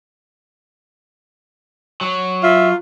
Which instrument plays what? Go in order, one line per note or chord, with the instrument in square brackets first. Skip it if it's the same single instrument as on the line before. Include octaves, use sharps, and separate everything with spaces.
[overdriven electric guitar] F#3
[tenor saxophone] F4 [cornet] E5